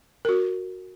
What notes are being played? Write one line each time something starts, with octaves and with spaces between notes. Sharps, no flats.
F#4 A#4